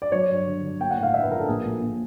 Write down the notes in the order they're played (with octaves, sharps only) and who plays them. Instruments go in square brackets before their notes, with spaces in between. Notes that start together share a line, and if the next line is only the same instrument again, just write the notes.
[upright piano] D5
F#3 C#5
G2
D3
D3
A#3 G5
F#5
A2
F5
D4 E5
B4
F3 A#4
A4
A#1 G#4
A#1
A#2